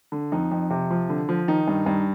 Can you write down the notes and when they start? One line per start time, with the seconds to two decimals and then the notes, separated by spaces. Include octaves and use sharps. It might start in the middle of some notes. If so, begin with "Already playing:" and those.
0.12 D3
0.32 F2 D#4
0.51 F2
0.70 C3
0.91 F3
1.09 D3
1.29 F3
1.48 D#3 D#4
1.67 G2
1.86 G2